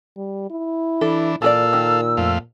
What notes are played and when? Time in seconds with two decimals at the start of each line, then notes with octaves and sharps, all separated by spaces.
0.17 G3
0.50 E4
1.01 E3 D4 A4
1.42 A#2 E3 G#4 A4 D5 F5 E6
1.73 D#3
2.17 F2 A3 F5